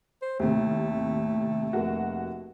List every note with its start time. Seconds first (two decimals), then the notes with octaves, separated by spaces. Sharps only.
0.22 C5
0.39 D#2 A2 C3 A3
1.73 F1 A#3 F#4